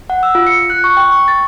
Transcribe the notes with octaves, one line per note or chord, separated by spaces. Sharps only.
F#5
E6
F4
C#7
F#6
C#6
G5
C#6
A6